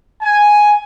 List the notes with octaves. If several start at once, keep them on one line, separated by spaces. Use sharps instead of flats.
G#5